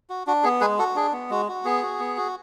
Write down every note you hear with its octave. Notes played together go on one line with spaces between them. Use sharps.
F#4
D4 F#4
B3 G#4
G#3 G#4 B4
F#4 A4
D4 G#4
B3
G#3 F#4
F#4
B3 G#4
F#4
B3
F#4